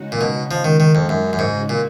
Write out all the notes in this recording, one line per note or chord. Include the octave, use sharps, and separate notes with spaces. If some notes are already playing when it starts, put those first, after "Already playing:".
Already playing: C#3 G#3 D#4 F#4
A#2
B2
F3
D#3
D#3
F2
F#2
F#2
G#2
A#2